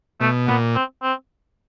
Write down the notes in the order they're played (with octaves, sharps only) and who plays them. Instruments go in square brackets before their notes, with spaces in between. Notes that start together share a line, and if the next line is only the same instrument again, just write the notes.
[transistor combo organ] B2 [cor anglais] A3
[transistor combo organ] A#2 [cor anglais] B3
[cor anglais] C4
C4